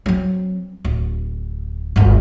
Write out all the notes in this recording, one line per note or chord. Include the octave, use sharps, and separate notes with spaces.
F#3 C4
D1
G1 D2